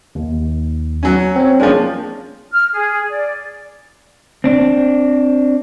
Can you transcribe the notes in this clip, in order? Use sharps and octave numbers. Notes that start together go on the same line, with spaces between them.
D#2
F#3 C#4
C4 C#5
F3 G#3 A#3 C#4 D4
F6
G#4
D5
C4 D4